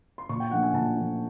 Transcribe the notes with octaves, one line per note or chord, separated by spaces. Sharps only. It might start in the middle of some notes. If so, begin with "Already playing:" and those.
C6
A#2 C#6
G5
F3 A3 D4 F#5
G#5
A#2 A5
F3 A3 D4